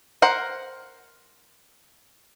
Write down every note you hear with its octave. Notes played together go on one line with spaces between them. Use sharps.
A#4 C5 F#5